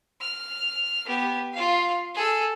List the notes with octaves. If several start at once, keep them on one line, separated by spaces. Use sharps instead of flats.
F6
B3 G4
F4 F5
G#4 A4